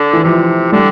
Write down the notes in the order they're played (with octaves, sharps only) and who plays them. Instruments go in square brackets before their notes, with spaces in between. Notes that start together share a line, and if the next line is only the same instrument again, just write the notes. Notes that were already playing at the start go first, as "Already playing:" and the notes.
Already playing: [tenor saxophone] D3
[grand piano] E3
[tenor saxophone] C3 [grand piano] F3
[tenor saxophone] D3 [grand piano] G3